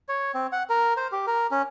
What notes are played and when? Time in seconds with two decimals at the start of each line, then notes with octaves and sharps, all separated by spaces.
0.08 C#5
0.34 C4
0.52 F#5
0.69 A#4
0.97 C5
1.12 G4
1.27 A#4
1.51 C#4